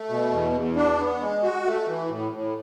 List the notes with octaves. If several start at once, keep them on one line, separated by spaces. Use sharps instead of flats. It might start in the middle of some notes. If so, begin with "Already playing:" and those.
Already playing: A3
B2
E2
E2
D4
B3
G#3
F#4
A3
E3
A2
A2